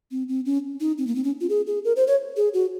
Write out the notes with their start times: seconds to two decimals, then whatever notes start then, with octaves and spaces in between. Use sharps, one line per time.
0.11 C4
0.28 C4
0.45 C#4
0.80 D#4
0.98 C4
1.07 A#3
1.15 C4
1.24 C#4
1.41 F4
1.49 G#4
1.67 G#4
1.85 A#4
1.96 C5
2.07 C#5
2.37 G#4
2.54 F#4